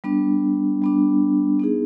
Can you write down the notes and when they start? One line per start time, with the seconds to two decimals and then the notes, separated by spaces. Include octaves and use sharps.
0.04 G3 B3 D4
0.82 G3 B3 D4
1.60 B3 D#4 G#4